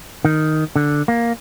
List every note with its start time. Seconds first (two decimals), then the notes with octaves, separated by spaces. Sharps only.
0.25 D#3
0.76 D3
1.08 A#3